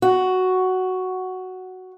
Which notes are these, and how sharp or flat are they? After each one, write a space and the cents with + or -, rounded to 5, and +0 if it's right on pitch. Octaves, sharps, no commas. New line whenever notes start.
F#4 +5